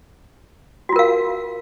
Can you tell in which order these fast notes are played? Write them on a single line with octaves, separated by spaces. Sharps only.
F#4 F4 A#4 F5